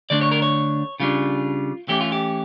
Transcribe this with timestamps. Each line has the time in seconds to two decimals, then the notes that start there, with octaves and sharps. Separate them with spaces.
0.10 D3 A3 D4 D5
0.21 C#5
0.31 A#4
0.42 C#5
1.00 C#3 G3 D4 F4
1.88 E3 A3 C#4 G4
2.01 F4
2.12 G4